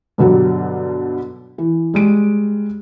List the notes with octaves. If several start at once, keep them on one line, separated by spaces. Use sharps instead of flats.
G2 B2 D3 F#3 G3
E3
G3 G#3 D7